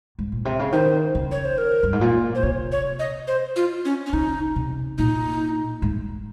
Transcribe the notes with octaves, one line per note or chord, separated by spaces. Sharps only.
G#2
A#2
C3
C#3
D#3 C5
C#3
C#5
C5
A#4
G2
G#2
A#2
C5
C3 C#5
C#5
D#5
C5
F4
C#4
C#4
C#3 D#4
C3
A#2 D#4
G#2